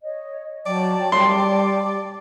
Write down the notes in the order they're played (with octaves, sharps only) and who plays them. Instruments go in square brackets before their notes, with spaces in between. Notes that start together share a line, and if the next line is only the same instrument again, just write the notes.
[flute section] C#5 D#5
[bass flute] F#3 [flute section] C#5 G5 A5 [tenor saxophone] D5
[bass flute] G3 [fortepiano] C6